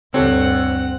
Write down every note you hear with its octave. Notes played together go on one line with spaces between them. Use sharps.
D2 G2 C4 G4 A4 C#5 F#5